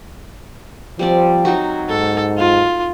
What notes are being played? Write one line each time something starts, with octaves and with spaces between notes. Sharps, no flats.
F3 G3 C4 D5
F#3 D#4 F#4
G#2 A4
F4